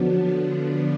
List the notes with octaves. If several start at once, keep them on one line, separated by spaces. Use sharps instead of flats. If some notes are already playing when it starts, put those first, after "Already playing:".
Already playing: D3 F3 F#3 B3 D4